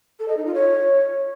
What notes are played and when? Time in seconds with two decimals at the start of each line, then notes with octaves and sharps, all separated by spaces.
0.19 A4
0.28 D#5
0.37 D#4
0.46 F4
0.54 C#5